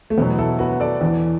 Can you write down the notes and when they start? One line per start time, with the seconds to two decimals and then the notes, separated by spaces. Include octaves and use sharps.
0.10 A3
0.18 E2 B2 F#3 B3
0.38 E4 A4
0.59 F#4 B4
0.80 A4 D5
1.01 E2 E3